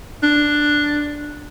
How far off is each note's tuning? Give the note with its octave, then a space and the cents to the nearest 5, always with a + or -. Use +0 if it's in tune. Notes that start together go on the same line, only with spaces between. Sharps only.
D4 +5